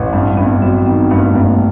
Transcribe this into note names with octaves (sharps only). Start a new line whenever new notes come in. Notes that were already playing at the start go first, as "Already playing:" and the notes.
Already playing: A1
G2 C4
G2 B3
F#3 C4
C4
D#3 B3
G2 A3
G2 A#3